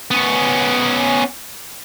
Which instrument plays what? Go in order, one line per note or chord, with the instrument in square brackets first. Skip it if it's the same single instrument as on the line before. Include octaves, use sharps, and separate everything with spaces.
[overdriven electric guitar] B3 C#4